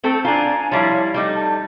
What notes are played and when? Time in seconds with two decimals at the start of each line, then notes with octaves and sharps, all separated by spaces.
0.04 A3 C4 A4
0.25 D4 F4 G#5 A#5
0.72 F3 G3 E4 C#5 F5 A5
1.14 G3 A3 D#4 D6
1.35 A5